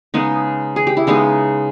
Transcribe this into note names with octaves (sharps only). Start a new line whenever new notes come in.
C#3 G#3 B3 D#4
G#4
G4
E4
C#3 G#3 B3 D#4